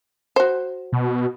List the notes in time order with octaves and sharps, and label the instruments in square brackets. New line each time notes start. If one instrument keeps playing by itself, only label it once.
[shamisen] F#4 C5
[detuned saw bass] B2